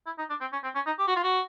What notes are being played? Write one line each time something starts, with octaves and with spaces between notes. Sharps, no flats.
E4
D#4
D4
C4
C#4
C4
C#4
D#4
G4
F#4
F4
F#4